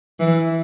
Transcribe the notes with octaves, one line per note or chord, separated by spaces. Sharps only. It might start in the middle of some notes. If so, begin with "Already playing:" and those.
E3